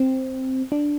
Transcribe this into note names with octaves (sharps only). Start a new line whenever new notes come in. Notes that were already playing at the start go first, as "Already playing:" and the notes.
Already playing: C4
D4